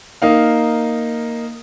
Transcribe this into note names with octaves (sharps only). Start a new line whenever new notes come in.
A#3 D#4 F5